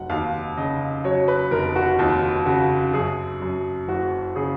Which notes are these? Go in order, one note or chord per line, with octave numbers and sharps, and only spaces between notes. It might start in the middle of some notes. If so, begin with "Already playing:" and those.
Already playing: F1 F#3 F#5
D#2 F5
C#3 D#5
F#3 C#5
B4
F1 A#4
F#4
D#2 F4
C#3 F#4
F#2 G#4
F#2
F#1 F#4
C#3 G#4